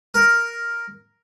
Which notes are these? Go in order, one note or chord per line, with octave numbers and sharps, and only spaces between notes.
A#4